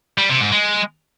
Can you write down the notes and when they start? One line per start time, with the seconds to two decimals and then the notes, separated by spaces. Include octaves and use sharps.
0.18 G3
0.30 C3
0.41 G#2
0.52 G#3